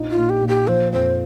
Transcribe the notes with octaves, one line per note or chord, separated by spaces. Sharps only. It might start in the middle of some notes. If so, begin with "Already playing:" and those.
Already playing: A#1 D#4
F4
A#2
G4
A#2
G4
F3 C5
F2 C5